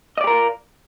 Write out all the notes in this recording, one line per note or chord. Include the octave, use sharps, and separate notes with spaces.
F4 G4 A#4 D5 D#5